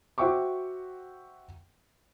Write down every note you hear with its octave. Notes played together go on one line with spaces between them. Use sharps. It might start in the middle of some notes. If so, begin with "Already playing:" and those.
F#4 C5 E5 G5 C#6 D6